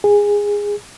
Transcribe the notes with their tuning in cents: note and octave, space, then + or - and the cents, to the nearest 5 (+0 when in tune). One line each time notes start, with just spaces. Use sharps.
G#4 -15